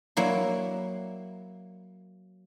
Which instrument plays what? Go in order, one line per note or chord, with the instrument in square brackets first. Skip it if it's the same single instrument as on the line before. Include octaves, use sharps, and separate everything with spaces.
[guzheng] F#3 A#3 E4